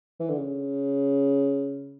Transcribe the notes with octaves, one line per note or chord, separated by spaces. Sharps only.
E3
D3
C#3